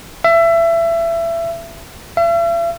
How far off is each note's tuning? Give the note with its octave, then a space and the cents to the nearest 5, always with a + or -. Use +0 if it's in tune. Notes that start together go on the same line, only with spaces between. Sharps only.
E5 +25
E5 +45